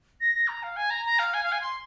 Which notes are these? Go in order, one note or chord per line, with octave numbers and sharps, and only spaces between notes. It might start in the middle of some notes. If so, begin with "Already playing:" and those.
A#6
A#6
A#5
F5
G#5
A#5
A#5
F5
G#5
F5
G#5
C6